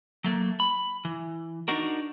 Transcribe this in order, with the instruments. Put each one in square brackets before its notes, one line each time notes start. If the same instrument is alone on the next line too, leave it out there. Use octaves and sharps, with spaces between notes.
[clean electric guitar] F#3 A3 A#3
B5
E3
D4 D#4 F#4 A#4